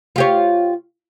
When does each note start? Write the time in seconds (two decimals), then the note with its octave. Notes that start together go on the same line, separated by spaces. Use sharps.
0.16 F4 G4 C#5